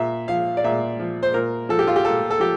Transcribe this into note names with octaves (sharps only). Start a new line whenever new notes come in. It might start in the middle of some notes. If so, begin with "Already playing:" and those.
Already playing: A#2 E5
F3 F5
D5
A#2 E5
F3
C5
A#2 A#4
F3 A4
G4
F4
G4
A#2 A4
A4
F3 G4